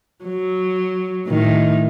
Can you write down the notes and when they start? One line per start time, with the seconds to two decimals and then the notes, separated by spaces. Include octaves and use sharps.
0.25 F#3
1.28 A2 D#3